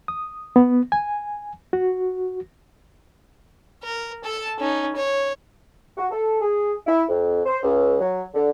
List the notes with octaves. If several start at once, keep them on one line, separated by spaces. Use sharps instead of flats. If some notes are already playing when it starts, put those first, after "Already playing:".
D#6
B3
G#5
F#4
A#4
A4 A5
C#4 D#4
C#5
F#4
A4
G#4
E4
F2
C5
C#2
F#3
D3